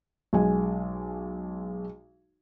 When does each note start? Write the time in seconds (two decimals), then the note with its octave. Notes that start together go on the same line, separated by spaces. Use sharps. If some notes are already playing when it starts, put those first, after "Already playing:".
0.33 B1 G#3 G#5